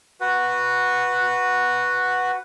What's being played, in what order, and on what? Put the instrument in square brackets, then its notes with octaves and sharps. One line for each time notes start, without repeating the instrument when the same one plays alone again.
[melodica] F#4 B4 F#5